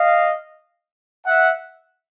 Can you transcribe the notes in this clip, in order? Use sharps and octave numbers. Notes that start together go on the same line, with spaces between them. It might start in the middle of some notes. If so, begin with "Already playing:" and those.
Already playing: D#5 F5
E5 F#5